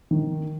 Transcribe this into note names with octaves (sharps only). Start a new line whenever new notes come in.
D#3